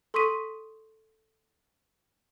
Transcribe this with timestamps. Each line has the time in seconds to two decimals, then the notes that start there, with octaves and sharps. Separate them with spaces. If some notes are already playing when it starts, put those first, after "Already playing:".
0.14 A4 C6 C#6 D#6 B6 D#7